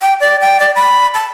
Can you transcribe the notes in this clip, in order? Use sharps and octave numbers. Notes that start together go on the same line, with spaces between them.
G5
D5
G5
D5
B5
A5